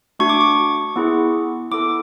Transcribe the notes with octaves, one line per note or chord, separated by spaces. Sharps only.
A3 D4 F#4 C#6
D6
C#6
B3 E4 G#4
B3 E4 A4 D6